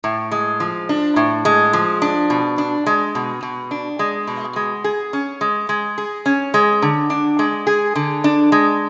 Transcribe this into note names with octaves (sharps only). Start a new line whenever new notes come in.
A2
G#3
F3
D4
A2
G#3
F3
D4
B2
D4
G#3
B2
B2
D4
G#3
B2
G#3
G#4
C#4
G#3
G#3
G#4
C#4
G#3
D3
D4
G#3
G#4
D3
D4
G#3